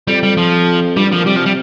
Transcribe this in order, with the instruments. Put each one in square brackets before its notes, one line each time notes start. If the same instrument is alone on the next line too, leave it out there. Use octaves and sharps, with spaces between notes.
[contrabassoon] F2 [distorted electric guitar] G3
[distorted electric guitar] G3
F3
[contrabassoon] G2 [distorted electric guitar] G3
[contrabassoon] G2
[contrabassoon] A#2 [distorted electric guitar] F3
[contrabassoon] C3 [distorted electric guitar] G3
[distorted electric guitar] F3
G3